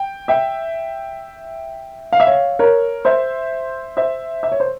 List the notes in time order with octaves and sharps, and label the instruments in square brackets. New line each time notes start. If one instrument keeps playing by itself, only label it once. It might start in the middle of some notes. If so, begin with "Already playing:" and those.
Already playing: [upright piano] G5
E5 G5
F5
E5
C#5 F5
A#4 C#5
C5 E5
C5 E5
E5
C#5
C5